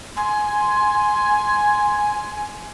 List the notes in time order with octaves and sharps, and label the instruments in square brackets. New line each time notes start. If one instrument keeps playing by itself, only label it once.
[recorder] G#5 [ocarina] C6